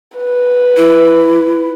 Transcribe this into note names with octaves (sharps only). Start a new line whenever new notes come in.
B4
E4